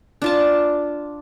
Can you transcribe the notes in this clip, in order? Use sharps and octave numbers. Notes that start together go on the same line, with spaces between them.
D4 F4 A5